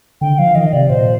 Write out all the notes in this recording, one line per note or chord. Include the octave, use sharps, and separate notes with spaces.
D3 G5
F3 F5
D#3 D#5
C3 D5
A#2 C5